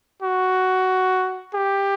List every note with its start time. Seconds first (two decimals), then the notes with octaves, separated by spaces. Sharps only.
0.22 F#4
1.55 G4